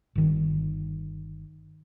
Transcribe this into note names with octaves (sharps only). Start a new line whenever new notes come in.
G1 D#3